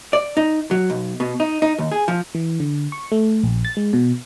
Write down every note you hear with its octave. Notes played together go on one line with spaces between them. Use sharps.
D5
D#4
F#3
B1
B2
D#4
D#4
D#2
G#4
F3
E3
D3
C#6
A3
A#1
A6
G#3
B2